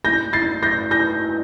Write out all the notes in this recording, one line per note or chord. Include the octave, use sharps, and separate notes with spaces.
G6 A#6
A6 C7
G6 A#6
G6 A#6